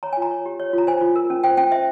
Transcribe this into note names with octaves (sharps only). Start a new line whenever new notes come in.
C#5 A#5
F4 G#5
A#5
C#5
G4
C#5
F4 A#5
C5 G#5
F4
A#4
C#4
C5 G5
C#4 G5
C5 E5